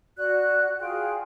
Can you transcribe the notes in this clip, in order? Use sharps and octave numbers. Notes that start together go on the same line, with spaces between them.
F#4 D5 F#6
F4 G#4 G5